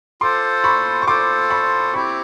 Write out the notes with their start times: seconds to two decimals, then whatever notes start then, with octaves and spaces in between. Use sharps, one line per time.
0.21 F4 A4 C5 C6 D6
0.64 B5 C#6
1.02 C#6
1.07 F4 A4 C5 C6 D6
1.50 B5 C#6
1.93 C4 E4 G4 B5 C#6